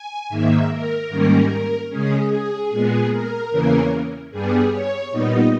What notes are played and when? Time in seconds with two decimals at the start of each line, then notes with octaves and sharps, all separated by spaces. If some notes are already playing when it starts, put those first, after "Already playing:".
Already playing: G#5
0.29 G#2 D#3 A#3 E5
0.69 A#4
1.09 G#2 D#3 G3 A#3 C#4
1.90 C#3 G#3 C#4 G#4
2.30 G#4
2.70 A#2 G#3 B3 G#4
3.10 A#4
3.51 E2 C#3 E3 A#3 C#4
4.31 G2 G3 B3 G#4
4.72 C#5
5.11 A#2 G3 B3 D#4 D#5